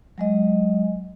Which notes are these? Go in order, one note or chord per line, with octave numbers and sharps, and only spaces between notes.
F#3 G#3 D#5